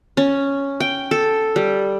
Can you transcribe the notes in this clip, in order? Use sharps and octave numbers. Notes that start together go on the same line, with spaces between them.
C#4
G5
A4
G3